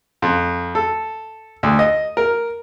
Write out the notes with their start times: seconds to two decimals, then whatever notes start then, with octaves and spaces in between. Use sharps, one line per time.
0.22 F2
0.75 A4
1.63 D2
1.79 D#5
2.17 A#4